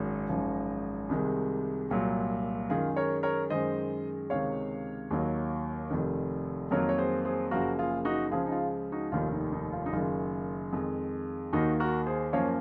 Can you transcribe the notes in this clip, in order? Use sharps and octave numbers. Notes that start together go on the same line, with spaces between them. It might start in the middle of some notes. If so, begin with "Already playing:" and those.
Already playing: G#1 F#2 D#3 F#3 D#4 F#4
G#1 F#2 F3
C2 C3 D#3 G#3
C2 A#2 F#3
F#2 D#3 G#3 F4 G#4
A#4 C#5
A#4 C#5
F#2 D#3 G#3 C5 D#5
C#2 C3 D#3 C#5 F5
D#2 D#3 F#3 A#3
F1 F2 D#3
F2 D#3 F#3 A#3 A#4 C#5
C#5
G#4 C5
G#4 C5
F#1 F#2 F3 A#3 F#4 A#4
F4 G#4
D#4 F#4
C#2 C#3 F3 G#3 F4 G#4
D#4
F4
D#4 F#4
F1 D#2 D#3 F4
D#4
D#4
F4
D#4
F#1 F#2 D#3 F4
F2 D#3 G#3
D#2 D#3 A#3 D#4 F#4
F#4 A#4
G#4 C5
F#2 F3 A#3 C#5 F5